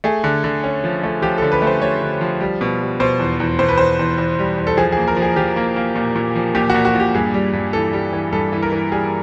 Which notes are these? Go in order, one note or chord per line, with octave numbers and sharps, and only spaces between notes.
A3 G#4
D3
D3
C#4
F3
A3
F3 G4
A4
D3
B4
A3 C5
A3 C#5
D3
F3
G3
B2
G3
B2 C5
E2
E2
B2 C5
B4
E2 C5
E2
E2
G3
E2
A4
F3 G#4
G#4
A#3
A#4
F3
G#4
F3 G4
A#3
A#3
A#2
A#2
F3
A#2 G4
F#4
A#2
F#4
A#2 G4
G2 G#4
G3
G2
E3 A4
G3
E3
G2 A4
E3
A#4
E3
G3 G#4